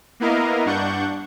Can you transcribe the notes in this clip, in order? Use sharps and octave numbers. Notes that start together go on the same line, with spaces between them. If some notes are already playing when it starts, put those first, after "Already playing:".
A#3 B3 E4 A#4 D#5 F5
G2 D4 F#5 C#6 G6